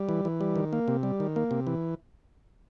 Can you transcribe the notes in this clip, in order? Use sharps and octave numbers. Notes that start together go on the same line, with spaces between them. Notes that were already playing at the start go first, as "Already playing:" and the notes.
Already playing: G3
E3
E3
G3
D#3
A#3
C3
G3
D#3
A#3
C3
E3